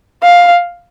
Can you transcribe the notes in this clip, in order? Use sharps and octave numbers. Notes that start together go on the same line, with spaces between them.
F5